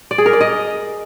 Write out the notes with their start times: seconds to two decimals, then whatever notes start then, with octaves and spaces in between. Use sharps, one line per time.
0.11 D5
0.18 G#4
0.26 A#4
0.33 D5
0.41 D#5